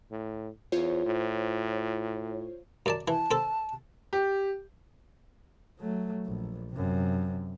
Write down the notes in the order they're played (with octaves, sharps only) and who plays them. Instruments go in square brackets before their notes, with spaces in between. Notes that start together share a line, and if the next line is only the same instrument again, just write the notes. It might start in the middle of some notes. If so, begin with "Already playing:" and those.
[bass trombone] A2
[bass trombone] E2 [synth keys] F4 C5 C#5
[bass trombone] A2
[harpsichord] F#2 D5 A5
[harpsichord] E3 [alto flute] A5
[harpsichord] C4 A4
[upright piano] G4
[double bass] F#3 A3
A#1
F#2 C3